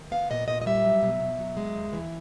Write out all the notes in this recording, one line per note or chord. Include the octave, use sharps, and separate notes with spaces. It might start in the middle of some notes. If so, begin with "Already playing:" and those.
Already playing: D#3
B3 F5
A#2 D#5
A#2 D#5
D#5
G3 E5
F#3
B2
B2
F#3
G#3
D#2
E3